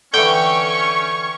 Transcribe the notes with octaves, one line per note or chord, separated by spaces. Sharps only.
D3 E3 C#4 G5 C#6